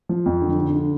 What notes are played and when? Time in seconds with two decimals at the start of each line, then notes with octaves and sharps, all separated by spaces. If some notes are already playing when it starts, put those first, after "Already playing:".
0.09 F3
0.26 F2
0.42 D3
0.59 D3
0.75 D3